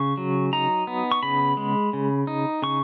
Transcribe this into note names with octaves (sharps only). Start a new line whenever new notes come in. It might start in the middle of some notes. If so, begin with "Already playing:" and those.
Already playing: C#3 C#6
F#3
D#4 A#5
B3
C#6
C#3 B5
G#3
C#3
D#4
C#3 C#6